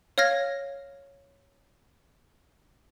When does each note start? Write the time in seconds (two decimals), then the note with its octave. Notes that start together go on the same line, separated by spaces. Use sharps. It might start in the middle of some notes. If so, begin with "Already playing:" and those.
0.18 C#5 F5 F6 G#6 A#6